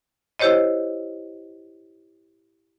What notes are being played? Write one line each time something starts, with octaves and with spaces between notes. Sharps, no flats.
E4 G4 C5 C#5 D#5